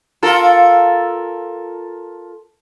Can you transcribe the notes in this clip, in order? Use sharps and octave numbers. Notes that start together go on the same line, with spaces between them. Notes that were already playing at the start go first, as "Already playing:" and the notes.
F4 A4 A#4